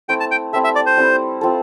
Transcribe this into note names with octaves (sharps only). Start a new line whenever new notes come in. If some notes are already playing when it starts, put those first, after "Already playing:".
A3 C4 E4 A4 G5
A5
G5
G3 C4 E4 A4 E5
E5
D5
C5
G3 C4 E4 A4
C4 F4 A4